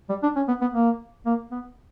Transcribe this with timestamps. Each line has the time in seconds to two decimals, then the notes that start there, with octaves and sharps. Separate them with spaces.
0.09 G3
0.23 D4
0.36 C#4
0.48 B3
0.61 B3
0.74 A#3
1.26 A#3
1.51 B3